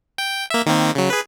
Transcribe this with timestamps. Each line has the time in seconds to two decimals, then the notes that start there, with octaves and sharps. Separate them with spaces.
0.18 G5
0.50 A#3 E5
0.66 D#3 A#3 C4
0.95 C#3 F#3
1.10 G#4 B4